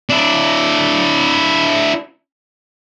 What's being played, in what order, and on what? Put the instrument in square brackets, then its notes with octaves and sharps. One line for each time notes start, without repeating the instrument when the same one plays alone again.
[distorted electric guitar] D4 E4